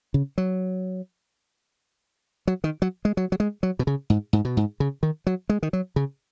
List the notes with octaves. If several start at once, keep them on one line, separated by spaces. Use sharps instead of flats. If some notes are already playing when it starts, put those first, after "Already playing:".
C#3
F#3
F#3
D#3
F#3
G#3
F#3
F#3
G#3
F#3
B2
C#3
G#2
G#2
B2
G#2
C#3
D#3
F#3
G#3
D#3
F#3
C#3